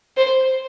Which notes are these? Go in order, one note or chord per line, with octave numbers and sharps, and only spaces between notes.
C5